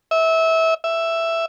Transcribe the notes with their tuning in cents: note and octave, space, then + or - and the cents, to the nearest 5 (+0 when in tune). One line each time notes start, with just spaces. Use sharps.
E5 -25
E5 +5